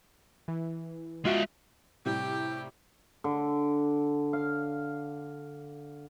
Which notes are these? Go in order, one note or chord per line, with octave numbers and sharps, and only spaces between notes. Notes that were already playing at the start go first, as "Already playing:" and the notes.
E3
G#3 F4 F#4 E5
A2 C3 G3 G4 G5
D3
F5